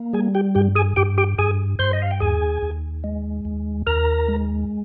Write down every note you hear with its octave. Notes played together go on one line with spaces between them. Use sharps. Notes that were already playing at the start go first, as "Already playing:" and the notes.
Already playing: A#3
G3 G#4 G#5
G4 G5
G2 G4 G5
G#4 G#5
G2 G4 G5
G4 G5
G2 G#4 G#5
G2 C5 C6
D#5
F5
G5
D#2 G#4 G#5
D#2
G#3
D#2
D#2 A#4 A#5
G#3